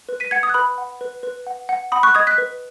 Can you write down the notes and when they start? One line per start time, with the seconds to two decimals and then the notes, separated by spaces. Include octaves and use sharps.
0.09 B4
0.20 B6 D#7
0.31 F#5 G#6 C#7
0.43 D#6 G#6
0.49 F#6
0.54 B4 B5 D#6
0.78 F#5
1.01 B4
1.23 B4
1.47 F#5
1.69 F#5
1.92 F#5 B5 D#6
2.03 C#6 F#6
2.15 D#5 D#6 G#6
2.27 F#6 B6
2.38 B4